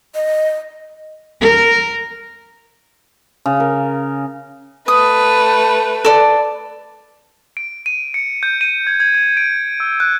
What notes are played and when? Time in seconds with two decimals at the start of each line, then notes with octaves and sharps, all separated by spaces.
0.15 D#5
1.40 A#4
3.46 C#3
3.60 A#4
4.88 A3 B4 D#6
6.05 A4 D5
7.57 D7
7.86 D#7
8.14 C#7
8.43 G6
8.61 D#7
8.87 G#6
9.00 G#6
9.15 G#6
9.37 D7
9.80 E6
10.00 F#6